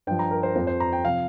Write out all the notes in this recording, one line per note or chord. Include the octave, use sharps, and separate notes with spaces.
G2 F3 G5
A#5
A#4
C5
F2 F3 C5
C5
A#5
G5
C3 F3 F5